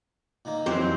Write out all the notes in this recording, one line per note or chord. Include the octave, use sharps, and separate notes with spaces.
A#2 D#3 A#3
F2 E3 F#3 C4 G4 C5